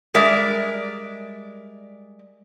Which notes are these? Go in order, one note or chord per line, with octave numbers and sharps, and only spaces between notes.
G3 G#3 A#4 D5 E5